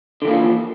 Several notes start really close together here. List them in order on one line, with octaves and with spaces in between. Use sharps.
D3 E3 A#3 F4 F3